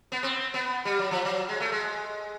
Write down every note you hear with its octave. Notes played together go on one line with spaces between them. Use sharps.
B3
C4
B3
G3
F#3
F3
F#3
G#3
A3
G#3